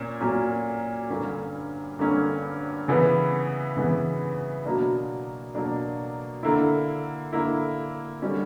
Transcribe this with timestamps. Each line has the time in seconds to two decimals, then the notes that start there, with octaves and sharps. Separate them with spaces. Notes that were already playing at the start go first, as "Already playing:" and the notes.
Already playing: A#2 A#3 C#4
0.21 A#2 F#3 A#3 C#4
1.10 G2 D3 A#3 C#4
1.99 G2 D3 A#3 C#4
2.88 C#3 E3 B3
3.77 C#3 E3 B3
4.66 B2 F#3 A#3 D4
5.55 B2 F#3 A#3 D4
6.43 D3 A#3 E4
7.33 D3 A#3 E4
8.22 D3 G3 C#4